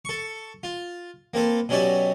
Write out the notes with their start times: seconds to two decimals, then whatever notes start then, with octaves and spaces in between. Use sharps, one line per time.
0.05 A4 C#6
0.63 F4
1.34 A#3 C4 A4 B4
1.69 B2 F#3 C#4 G4 D5 E5